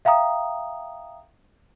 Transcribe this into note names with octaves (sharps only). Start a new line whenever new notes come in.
E5 F5 G5 A#5 D#6